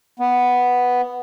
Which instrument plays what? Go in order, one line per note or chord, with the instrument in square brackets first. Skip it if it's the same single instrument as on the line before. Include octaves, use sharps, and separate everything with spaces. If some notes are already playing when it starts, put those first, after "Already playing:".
[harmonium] B3